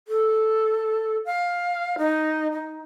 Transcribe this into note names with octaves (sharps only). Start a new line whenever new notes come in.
A4
F5
D#4
D#4